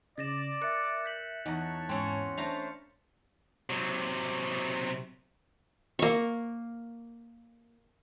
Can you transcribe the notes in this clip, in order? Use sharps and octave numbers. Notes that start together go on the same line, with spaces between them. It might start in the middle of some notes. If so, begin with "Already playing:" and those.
C#3 D5 A6 A#6 E7
A#4 E5 F#6 A6 C#7
G6 B6 F#7
E2 D#4 C#5 A5 A#5 C#6
G#2 C4 C#4 C6 C#7
A3 D4 C5 F5 A5 A#5
C3 F#3
A#3 C#6